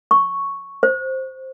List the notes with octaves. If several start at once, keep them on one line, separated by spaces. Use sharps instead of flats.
C#6
C5